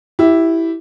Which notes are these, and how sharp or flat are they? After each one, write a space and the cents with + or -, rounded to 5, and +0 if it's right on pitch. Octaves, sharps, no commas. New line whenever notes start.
E4 +0 G4 -15